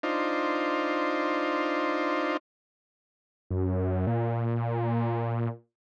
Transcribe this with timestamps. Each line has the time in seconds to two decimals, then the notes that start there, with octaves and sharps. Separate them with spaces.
0.03 D4 D#4 F4 C5
3.50 F#2
4.07 A#2